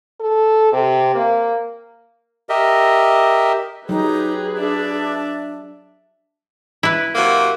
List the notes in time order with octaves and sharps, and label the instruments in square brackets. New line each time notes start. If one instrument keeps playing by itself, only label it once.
[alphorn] A4
C3
A#3
[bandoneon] G4 A#4 D#5 E5
[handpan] F#3 [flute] D#4 [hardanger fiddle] G4 A#5 [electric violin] G#4 B4
[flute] D4 [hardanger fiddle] D5 E5
[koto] E4 B4
[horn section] C3 F#3 A#3